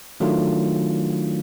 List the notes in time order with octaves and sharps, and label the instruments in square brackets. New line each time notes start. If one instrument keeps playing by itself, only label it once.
[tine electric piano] D#3 F#3 A3 D4 F4